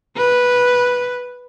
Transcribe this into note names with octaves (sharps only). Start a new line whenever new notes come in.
B4